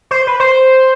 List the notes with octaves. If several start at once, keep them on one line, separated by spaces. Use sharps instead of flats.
C5
B4
C5